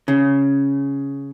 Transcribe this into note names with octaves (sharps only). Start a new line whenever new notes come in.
C#3